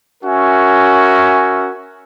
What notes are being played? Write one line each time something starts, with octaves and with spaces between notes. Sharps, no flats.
C#4 F#4 A#4 E5 G#5